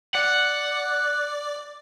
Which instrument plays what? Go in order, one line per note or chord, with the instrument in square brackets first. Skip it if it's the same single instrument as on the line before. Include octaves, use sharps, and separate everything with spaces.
[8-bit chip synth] D5 [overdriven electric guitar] F#5